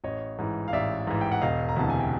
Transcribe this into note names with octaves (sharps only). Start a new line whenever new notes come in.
A1 C#5 D#5
G#2 E3
F5
A1 D5 E5
G#2 E3
G5
F#5
E1 D#5 F5
A#5
D2 C3 E3 A5
G#5
G5